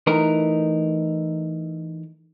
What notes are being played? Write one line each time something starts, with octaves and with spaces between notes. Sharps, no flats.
E3 A3 D#4 A#4